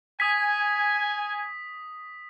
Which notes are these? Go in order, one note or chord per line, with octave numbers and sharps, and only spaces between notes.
G#5 D#6 B6